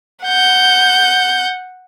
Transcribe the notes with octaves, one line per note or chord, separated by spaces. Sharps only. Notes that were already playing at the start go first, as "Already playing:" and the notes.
F#5 G6